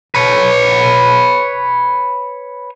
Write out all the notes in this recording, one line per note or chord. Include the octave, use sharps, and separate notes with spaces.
B4 C#5